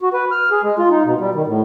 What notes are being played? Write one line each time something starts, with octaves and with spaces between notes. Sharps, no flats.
F#4
B4
F6
G#4
G#3
F4
D#4
B2
G3
D#3
A2